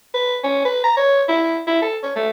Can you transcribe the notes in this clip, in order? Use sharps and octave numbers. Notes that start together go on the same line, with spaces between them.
B4
C#4
B4
A#5
C#5
E4
E4
A4
C#5
A3